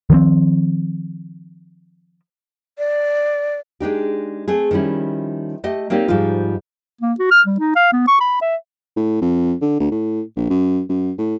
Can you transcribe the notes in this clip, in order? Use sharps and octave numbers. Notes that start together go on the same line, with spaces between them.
D#3 F3 B3 C4
D5
G#3 D4 D#4 G4
A3 C4 G#4
D#3 F3 G3 C#4 E4
A3 G4 D#5
A#3 C4 D#4 G4 C#5 D5
G#2 F3 G3 D#4 F4
A#3
F#4
F6
G3
D#4
F5
B3
C#6
B5
E5
A2
F2
D3
D2
A2
A#1
F#2
F#2
A2